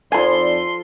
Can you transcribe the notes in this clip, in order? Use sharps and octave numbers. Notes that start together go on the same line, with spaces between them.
F2 F3 D#4 A4 D5 G#5 B5 C6